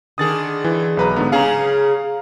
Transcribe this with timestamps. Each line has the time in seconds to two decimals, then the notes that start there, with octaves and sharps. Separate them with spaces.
0.18 D3 D#3 G#4 D#6 A6
0.64 E3
0.97 B1 B4 A#5
1.16 G#2 D3 B3
1.32 C#3 G#4 F5 A#5